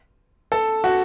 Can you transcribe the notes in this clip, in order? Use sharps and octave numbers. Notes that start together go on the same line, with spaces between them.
A4
F#4